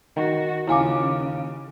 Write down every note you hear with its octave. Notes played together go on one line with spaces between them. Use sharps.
D#3 F#4
D#2 C#3 E4 F4 G#5 C#6 D6